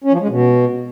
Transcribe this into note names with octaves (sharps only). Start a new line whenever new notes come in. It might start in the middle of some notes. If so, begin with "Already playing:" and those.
C#4
F3
G#3
B2